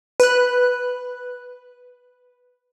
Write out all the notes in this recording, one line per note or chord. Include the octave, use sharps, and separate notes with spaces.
B4 F#6